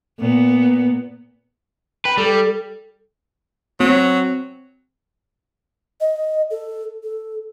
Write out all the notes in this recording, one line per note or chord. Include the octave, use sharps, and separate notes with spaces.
A#2 B3
B4 G5
G3 A4
F#3 C4
D#5
A4
A4